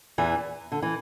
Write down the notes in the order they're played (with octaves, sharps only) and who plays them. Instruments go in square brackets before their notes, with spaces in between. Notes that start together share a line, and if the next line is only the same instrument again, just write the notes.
[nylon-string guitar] E2 E3
D3
E3